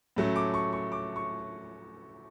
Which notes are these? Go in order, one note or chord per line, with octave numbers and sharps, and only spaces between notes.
A2 F#3 A3 C#4
D6
C#6
C#6
D6
C#6